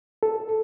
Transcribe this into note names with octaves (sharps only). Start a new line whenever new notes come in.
A4